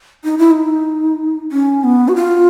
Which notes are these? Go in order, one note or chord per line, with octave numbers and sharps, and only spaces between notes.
D#4
E4
D#4
C#4
B3
F#4
F4